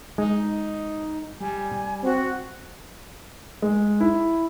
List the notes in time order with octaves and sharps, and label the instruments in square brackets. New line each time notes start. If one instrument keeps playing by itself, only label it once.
[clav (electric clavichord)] G#3 [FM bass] D#4
[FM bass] G3 [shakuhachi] G#5
[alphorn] C4 [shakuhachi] F#4
[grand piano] G#3
E4